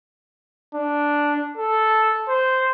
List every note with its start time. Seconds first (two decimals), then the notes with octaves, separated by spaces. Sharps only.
0.75 D4
1.58 A4
2.29 C5